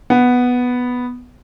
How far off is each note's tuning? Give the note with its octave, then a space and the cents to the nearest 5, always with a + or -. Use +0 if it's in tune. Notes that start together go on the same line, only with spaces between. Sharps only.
B3 +0 F#5 +0